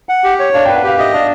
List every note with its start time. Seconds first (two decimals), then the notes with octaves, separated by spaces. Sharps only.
0.09 F#5
0.24 G4
0.39 C#5
0.53 D4 F5
0.65 B4 G5
0.76 F#5
0.84 G4 F5
0.98 D#5 E5
1.13 D4 F5